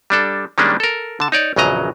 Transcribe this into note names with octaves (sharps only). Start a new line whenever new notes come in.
G3 D4 A4
D#3 G3 G#3 A#3 C#4 D4
A4 A#4
D3 A5
D#4 C#5 D5
A#1 E2 C#3 F#3 D#5 A#5